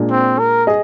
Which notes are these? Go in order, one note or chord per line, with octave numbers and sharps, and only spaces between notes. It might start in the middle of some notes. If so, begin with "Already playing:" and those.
Already playing: A#2 G#3 D4
C4
A#4
G#4 D#5